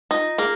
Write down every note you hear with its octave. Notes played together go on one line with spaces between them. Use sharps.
D#4 F4
A#3 G#4